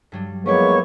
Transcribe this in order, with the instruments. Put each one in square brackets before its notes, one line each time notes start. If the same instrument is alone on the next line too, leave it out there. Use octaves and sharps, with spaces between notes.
[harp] G2 F#3 G3
[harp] F3 E4 G4 [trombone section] G#3 A#3 B3 [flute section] C#5 C#6